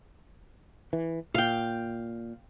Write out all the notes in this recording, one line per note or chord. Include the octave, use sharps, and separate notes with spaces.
E3
A#2 F5 G5